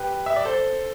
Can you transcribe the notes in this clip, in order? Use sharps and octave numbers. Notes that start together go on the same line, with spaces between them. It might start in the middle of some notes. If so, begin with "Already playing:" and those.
Already playing: G4 B4
E5
D5
A4 C5